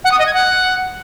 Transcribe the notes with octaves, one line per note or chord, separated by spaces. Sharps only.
F#5
D#6
D#5
G#6
F#5